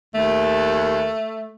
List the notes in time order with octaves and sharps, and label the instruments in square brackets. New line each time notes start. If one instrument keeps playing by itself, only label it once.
[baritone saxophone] D#2 [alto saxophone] A3